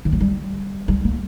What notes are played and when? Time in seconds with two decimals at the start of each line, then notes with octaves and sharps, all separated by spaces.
0.05 D#3
0.12 F#3
0.21 G3
0.88 G3
1.05 A#3